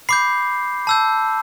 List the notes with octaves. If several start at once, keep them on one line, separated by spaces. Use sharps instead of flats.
B5 D6 G6 C7
A5 E6 G6